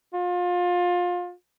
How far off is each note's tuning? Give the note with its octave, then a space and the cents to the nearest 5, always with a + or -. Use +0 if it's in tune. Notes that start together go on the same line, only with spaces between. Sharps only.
F4 +25